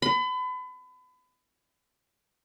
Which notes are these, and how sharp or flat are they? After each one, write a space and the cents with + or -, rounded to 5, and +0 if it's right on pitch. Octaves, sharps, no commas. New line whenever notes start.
B5 +35